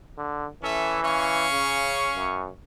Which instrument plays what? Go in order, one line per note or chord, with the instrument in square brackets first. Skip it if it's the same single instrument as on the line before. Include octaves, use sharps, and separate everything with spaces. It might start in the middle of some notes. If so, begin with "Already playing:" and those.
[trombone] D3
[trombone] E3 [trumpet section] C#4 A4 E5
[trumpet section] C#4 F5 C#6
[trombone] C#3
F#2